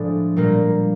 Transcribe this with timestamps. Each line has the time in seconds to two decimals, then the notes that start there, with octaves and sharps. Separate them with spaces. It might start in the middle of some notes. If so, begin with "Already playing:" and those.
Already playing: A2 F3 G#3 D4
0.37 A#2 G3 A#3